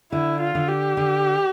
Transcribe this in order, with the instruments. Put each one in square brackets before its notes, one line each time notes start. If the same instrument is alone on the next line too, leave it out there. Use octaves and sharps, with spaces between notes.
[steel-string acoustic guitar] D3 [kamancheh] E4
[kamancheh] F4
[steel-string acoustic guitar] D3
[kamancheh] G4
[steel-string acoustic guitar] D3